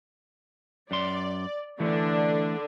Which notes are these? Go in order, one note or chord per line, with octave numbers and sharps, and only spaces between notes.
F#2 D5 C6
D3 E3 A3 D4